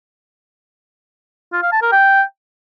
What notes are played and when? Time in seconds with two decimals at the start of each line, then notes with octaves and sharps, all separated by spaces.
1.52 F4
1.62 F5
1.72 A5
1.82 A#4
1.92 G5